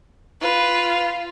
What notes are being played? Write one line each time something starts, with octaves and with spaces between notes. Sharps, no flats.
F4 B4